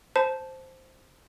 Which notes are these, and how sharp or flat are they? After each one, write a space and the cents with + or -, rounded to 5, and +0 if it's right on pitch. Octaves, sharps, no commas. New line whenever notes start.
C5 +0 A5 -10